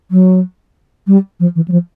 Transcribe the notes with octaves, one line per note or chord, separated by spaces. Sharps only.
F#3
G3
F3
E3
F#3
F3